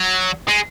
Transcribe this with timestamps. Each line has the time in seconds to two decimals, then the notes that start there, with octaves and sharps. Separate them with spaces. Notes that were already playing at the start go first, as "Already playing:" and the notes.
Already playing: F#3
0.49 G#3